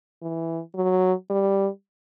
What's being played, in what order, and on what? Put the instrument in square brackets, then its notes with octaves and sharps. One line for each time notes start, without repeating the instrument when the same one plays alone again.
[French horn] E3
F#3
G3